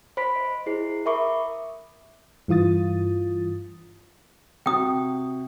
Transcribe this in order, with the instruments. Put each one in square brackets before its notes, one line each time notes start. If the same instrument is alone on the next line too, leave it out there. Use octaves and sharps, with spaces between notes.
[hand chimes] C5 B5 B6 D7
D#5
E4 G#4 C5 C7
A#4 E5 B5 C#6 D6
D#6
[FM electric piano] G2 E3 F4 D#6 A6
[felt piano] C3 F#4 [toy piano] G5 D#6